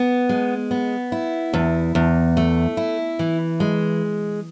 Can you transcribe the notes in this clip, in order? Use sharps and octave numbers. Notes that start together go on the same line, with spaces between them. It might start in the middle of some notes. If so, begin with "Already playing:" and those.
Already playing: B3
G#3
B3
E4
E2
E2
A3
E4
E3
G#3